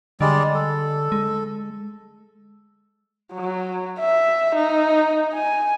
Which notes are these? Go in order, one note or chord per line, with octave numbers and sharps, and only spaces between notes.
D3 G3 G#3 D5
A4
G#3
F#3
E5
D#4
G#5